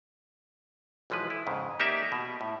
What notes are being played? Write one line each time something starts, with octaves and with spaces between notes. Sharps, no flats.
B1 E3 F3 G#3 B4
E4
F2 G#2 C#3
A#3 D#4 G4 A#4 D5 E5
B2
A2